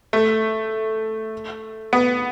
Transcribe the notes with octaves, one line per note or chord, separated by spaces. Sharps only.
A3
B3